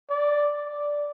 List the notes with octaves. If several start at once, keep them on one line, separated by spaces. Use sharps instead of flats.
D5
D5